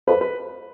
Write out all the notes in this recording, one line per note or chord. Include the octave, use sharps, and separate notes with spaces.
F2 B4
B4